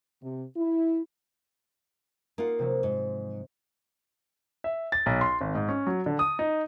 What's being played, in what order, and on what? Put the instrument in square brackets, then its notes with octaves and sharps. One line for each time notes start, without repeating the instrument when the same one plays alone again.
[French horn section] C3
E4
[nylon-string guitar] A#3 F#5 [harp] D#4 F4
[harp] C3 F3 F#3
[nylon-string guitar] G#2
[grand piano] E5
A6
B1
C6
G#1
G#2
C#4
F#3
D3
D#6
D#4